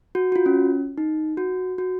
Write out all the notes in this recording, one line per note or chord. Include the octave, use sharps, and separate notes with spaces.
F#4
F#4
F4
C#4
D#4
F#4
F#4